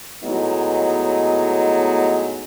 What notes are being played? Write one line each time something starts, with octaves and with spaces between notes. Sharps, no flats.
A2 F#3 G#3 B3 D#4